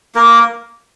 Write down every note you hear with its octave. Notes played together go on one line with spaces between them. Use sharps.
A#3 A#4